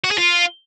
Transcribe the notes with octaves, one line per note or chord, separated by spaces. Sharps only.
F#4
G#4
F4